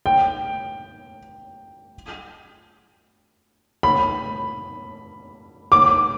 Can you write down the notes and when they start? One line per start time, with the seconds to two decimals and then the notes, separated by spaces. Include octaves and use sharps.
0.06 G5
3.83 B5
5.72 D6